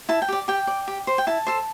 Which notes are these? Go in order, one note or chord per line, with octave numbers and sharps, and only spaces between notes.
E4 A5
G5
G4 D5
G4 G5
D5
G4
C5
G5
E4 A5
A4 C5